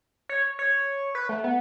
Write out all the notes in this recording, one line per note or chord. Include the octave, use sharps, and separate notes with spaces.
C#5
C#5
B4
A3
B3